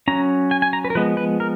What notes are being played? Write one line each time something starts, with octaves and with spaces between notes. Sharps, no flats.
F#3 C#4 A#5
G#5
G#5
A#5
B4
A#4
F3 G#3 B3 B4
B4
A#4